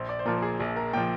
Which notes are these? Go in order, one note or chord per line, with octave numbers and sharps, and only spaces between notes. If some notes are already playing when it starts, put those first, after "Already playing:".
Already playing: A#1 C5
D5
C5
A#2 F3 A#4
A#4
G#4
A#1 G#4
A#4
A#2 F3 G5